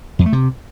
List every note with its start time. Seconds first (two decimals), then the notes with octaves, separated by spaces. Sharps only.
0.19 F2
0.26 A3
0.33 C3